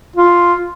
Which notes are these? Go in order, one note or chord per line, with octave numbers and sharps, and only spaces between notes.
F4